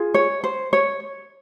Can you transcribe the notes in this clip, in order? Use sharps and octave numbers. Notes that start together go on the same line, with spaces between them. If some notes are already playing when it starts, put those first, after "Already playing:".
Already playing: F4 G#4
C#5
C5
C#5